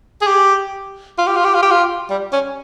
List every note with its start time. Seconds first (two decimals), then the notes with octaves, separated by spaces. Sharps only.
0.21 G#4
0.27 G4
1.18 F4
1.27 G4
1.36 F4
1.45 G4
1.54 F4
1.63 G4
1.71 F4
2.10 G3
2.33 C#4